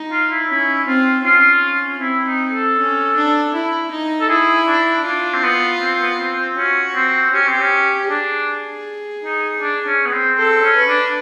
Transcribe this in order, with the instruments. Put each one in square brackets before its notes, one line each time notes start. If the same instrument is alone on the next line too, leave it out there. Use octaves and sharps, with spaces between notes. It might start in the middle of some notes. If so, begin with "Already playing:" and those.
Already playing: [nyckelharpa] D#4
[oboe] F4
E4
[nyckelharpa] C#4 [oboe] E4
[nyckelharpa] C4 [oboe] F4
[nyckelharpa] C#4 [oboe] F4
[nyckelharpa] C4 [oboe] E4
[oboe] D#4
A4
[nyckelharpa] C#4
D4
E4
D#4
[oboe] A4
[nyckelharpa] E4 [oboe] G#4
[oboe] D4
[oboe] D4 [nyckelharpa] F4
[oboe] C4
B3
C4
B3
C4
C4
[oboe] C#4 [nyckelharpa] F#4
[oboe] C4
[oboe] C#4 [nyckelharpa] G4
[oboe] C4
C#4
[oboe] D4 [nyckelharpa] G#4
[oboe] D#4
D4
C#4
B3
C4
[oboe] C4 [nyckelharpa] A4
[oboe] C#4
[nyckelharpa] B4
[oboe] D4